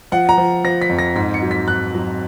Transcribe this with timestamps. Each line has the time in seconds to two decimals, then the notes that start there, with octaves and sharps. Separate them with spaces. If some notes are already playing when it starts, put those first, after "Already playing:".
0.12 F3 F#5
0.29 A#5
0.37 F3
0.64 F3 A#6
0.82 B6
0.90 F2
0.99 A#6
1.16 G#2 B6
1.34 C#7
1.42 F#3
1.51 B6
1.68 G#2 F#6
1.94 F#3